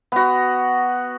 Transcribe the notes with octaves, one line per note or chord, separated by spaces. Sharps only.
B3 F#4